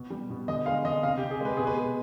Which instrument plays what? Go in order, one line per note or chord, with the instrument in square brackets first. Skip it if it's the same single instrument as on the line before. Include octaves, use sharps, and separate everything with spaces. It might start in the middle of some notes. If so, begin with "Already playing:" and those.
Already playing: [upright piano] B2
G3
B2
D3 D#5
G#3 F5
D3 D#5
C3 F5
G4
C3
G#4
G#3 B4
B2 G#4
B4
G#3